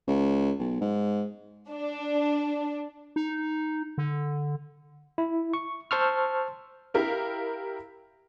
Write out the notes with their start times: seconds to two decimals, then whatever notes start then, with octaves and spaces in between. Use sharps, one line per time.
0.07 C#2
0.60 B1
0.81 G#2
1.70 D4
3.16 D#4
3.98 D3
5.18 E4
5.54 C#6
5.91 C5 A5 C6 C#6 E6 F6
6.94 E4 G4 A#4 F5